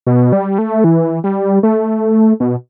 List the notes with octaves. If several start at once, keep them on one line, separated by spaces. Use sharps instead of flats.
B2
G3
A3
E3
G3
A3
B2